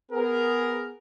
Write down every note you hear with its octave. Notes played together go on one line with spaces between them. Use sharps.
B3 G#4 A#4